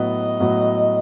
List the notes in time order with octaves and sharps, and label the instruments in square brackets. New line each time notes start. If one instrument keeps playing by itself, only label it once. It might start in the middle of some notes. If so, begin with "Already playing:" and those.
Already playing: [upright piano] A2 F#3 B3 F#4 [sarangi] D#5
[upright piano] A2 F#3 B3 F#4